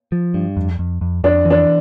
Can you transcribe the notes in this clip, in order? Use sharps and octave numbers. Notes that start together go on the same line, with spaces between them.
F3
G2
F2
F2
F2
F2 D4
E3
D4